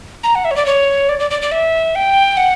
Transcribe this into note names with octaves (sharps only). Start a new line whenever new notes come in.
A#5
F#5
E5
C#5
D5
C#5
D5
D5
D5
D5
E5
G5
F#5